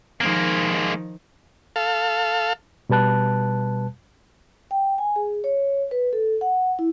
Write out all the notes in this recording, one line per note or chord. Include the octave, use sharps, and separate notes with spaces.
D#3 F3 G#3 A#3
A4 F5
B2 G3 B4 A5 F#6
G5
G#5
G#4
C#5
B4
A4
F#5
E4